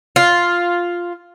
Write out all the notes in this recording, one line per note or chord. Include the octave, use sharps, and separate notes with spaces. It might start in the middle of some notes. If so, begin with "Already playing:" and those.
F4